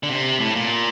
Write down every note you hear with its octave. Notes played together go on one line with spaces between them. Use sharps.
D3
C3
A2
A#2